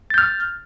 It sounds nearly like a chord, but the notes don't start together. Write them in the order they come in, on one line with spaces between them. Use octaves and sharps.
A6 G6 F6